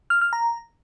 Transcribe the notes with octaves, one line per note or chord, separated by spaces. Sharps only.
F6
F6
A#5